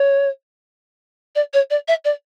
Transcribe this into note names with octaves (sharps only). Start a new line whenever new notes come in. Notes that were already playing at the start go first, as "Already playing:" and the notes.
Already playing: C#5
D5
C#5
D5
E5
D5